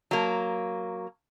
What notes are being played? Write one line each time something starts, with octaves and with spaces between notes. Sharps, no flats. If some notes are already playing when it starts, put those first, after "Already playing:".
F#3 A#3